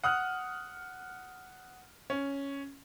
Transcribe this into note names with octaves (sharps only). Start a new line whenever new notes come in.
F#5 D#6 F6 F#6
C#4